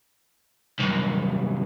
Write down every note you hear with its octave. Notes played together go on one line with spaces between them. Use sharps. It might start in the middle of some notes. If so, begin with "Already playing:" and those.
C2 F#2